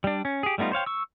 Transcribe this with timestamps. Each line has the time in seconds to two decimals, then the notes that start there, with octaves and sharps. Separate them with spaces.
0.04 G3 D4
0.25 C#4
0.43 G4 G#4
0.58 G3 A3 B3 D#4 F4
0.72 C5 C#5 F5 G5
0.86 C#6 E6